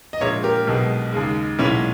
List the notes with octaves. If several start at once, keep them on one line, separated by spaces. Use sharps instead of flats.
D#5
A#1 A#2 G#3 C#5 E5
G4 A#4
B1 B2 G#3
D#2 C#3 G#3
B1 A#2 G#3 C#4 E4